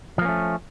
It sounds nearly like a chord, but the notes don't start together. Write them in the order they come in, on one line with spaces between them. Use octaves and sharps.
F3 A#3 C#4 A3